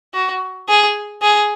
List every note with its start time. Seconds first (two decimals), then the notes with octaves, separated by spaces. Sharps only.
0.14 F#4
0.69 G#4
1.22 G#4